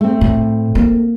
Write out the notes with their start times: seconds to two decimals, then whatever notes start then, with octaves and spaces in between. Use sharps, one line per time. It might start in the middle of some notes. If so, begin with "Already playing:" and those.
0.01 A3 C4
0.21 A2
0.75 A#3